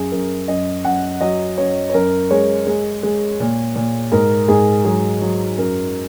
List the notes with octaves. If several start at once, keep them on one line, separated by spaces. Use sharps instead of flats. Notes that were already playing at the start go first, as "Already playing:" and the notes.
Already playing: F#2 G#4
F#2 A#4
F#2 D#5
F#2 F#5
F#3 D#5
F#2 C#5
C#5
F#2 A#4
G#3 C#5
G#3
G#3
A#2
A#2
G#2 A#4
G#2 G#4
F#3 G#4
F#3
F#2 A#4